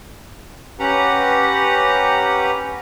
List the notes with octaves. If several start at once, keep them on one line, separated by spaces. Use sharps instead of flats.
C#4 G4 B4 F#5 A#5